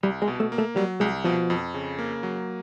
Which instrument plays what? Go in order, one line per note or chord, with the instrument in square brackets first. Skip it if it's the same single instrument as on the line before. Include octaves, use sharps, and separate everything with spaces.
[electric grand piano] C2 [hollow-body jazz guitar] G3
[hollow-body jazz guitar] G#3
[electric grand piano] B2
[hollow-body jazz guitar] A3
[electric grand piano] A#3
[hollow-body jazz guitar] A3
[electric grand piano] F#3 [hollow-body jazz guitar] G3
[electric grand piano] C2 [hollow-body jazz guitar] G#3
[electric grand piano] B2 [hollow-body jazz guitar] F3
[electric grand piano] F2
C#3
A#3
F#3